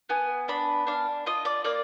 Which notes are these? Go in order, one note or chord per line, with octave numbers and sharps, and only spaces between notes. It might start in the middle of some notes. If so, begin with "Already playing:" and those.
B3 G#5
D4 B5
D4 F5
F4 D#5
D5
A#3 D5